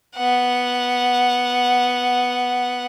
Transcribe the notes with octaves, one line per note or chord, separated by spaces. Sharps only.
B3 F#5